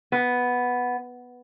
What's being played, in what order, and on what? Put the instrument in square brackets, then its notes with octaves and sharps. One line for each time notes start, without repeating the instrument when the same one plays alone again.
[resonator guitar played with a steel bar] B3